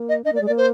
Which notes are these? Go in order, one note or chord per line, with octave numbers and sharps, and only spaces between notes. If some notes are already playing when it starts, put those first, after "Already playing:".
Already playing: A#3
D#5
D4 D#5
A#3 D5
G#3
D5
A#3
C5